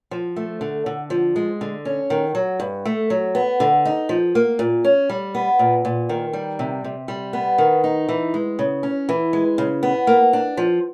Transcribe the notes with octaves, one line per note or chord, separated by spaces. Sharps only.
F3
A3
D3
D3
F3
G#3
D3
C#4
D#3
F#3
G2
A3
F#3
B3
D3
D#4
F3
A#3
A#2
C#4
G3
B3
A#2
A#2
D#3
G3
C3
C3
G3
B3
D#3
D#4
E3
G#3
C#3
C#4
E3
G#3
C#3
B3
A#3
D4
F3